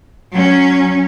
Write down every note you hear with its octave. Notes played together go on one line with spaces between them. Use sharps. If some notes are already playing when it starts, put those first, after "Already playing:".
F#3 C#4